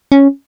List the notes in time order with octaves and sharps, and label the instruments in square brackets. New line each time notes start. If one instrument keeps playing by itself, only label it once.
[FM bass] C#4